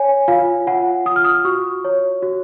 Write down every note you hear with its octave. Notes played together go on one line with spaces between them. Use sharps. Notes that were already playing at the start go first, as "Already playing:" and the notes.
Already playing: C#5 G#5
F4 F5
F4 F#5
F4 D#6
F6
D#6
F#4 C#6
C#5
F#4